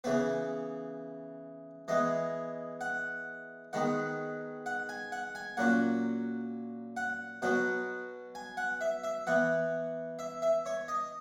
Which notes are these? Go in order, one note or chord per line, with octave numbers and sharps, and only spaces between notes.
C#3 E3 B3 B4
E3 G#3 B3 D#5
F#5
D#3 G#3 B3 F#5
F#5
G#5
F#5
G#5
A#2 F#3 C#4 F#5
F#5
B2 F#3 B3 F#5
G#5
F#5
E5
E5
E3 B3 F#5
E5
E5
C#5
D#5